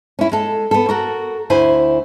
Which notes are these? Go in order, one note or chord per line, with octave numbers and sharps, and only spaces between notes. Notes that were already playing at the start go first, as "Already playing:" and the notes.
C#4 E4
G#3 A4
B3 A4
F#4 A4 A#4
D2 E4 C5 G#5